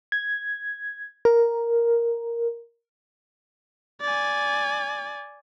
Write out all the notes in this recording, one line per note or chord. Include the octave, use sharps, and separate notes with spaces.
G#6
A#4
D5 G#5